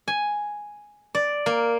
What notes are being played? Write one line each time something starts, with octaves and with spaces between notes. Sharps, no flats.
G#5
D5
A#3